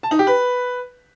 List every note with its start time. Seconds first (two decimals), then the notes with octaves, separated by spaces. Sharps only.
0.03 A5
0.11 D#4
0.19 G4
0.27 B4